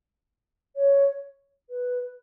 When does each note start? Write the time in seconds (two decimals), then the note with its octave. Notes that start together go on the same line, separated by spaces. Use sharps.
0.75 C#5
1.70 B4